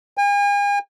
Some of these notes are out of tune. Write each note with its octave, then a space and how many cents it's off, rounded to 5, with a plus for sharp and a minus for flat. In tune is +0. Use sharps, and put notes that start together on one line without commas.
G#5 -40